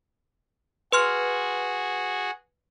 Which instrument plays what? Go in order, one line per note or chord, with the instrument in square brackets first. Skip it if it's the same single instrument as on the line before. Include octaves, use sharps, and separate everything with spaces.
[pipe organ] F#4 G#4 [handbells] B4 C6 F6